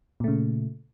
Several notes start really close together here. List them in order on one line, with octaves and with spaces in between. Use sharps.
A#2 A3 C#3